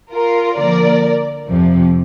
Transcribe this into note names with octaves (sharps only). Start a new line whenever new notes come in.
F4 A#4
D3 F3 A#3 A#4 D5
F2 C3 F3